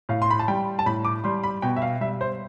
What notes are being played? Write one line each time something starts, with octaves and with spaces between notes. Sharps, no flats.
A2 F5
C6
B5
A5
G3 G5
A5
A2 B5
D6
G3 C6
B5
B2 G5
E5
F5
G3 E5
C5